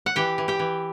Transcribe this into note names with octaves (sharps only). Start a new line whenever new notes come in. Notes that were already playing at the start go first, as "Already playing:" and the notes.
F#5
E3 G4 G5
E3
G4 G5
E3